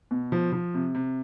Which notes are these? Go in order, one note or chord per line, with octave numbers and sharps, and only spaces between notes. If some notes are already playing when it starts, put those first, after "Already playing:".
B2
F3
F3
C3
C3